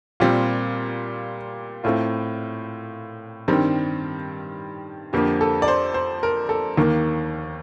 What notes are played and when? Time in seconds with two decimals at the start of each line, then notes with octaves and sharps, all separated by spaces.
0.20 A#2 G3 C4 F4
1.84 A2 A3 C4 F4
3.48 G2 D#3 G3 C4
5.13 F2 D3 F3 A#3 G4
5.41 A4
5.62 D5
5.68 C5
5.94 C5
6.23 A#4
6.49 A4
6.77 D#2 D#3 A#3